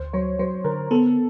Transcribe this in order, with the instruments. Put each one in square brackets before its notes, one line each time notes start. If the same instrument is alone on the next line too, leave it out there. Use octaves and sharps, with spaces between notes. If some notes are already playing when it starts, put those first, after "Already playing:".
Already playing: [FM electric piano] D2 [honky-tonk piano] C5
[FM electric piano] F#3 [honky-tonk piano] C#5
[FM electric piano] F#3 [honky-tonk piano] C5
[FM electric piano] D3 [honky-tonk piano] A#4
[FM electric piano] B3 [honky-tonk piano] A4